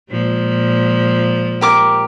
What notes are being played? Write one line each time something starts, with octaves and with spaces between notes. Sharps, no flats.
A#2 F3 G#3
G4 A#4 D6